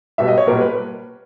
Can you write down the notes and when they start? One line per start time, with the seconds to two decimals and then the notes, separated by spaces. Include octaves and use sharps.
0.18 B1 B2 G3 E5
0.28 D#5
0.38 C#5
0.47 B1 A#2 G3 A#4
0.61 B4